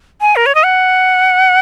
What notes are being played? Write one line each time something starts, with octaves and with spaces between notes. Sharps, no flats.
G#5
A#4
C#5
D#5
F#5